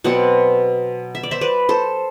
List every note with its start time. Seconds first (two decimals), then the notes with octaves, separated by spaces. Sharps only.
0.04 B2 F#3 C4 D5 F#5
1.15 E5
1.23 D5
1.31 C5 E5
1.41 B4 D5
1.69 A4 C5